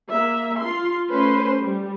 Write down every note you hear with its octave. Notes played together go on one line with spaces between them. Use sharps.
A#3 E5
F4 C6
A3 C#4 B4 C5 C6
G3